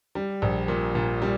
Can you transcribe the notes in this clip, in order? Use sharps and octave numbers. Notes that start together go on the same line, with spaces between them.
G3
A#1
A#2
A#2
G3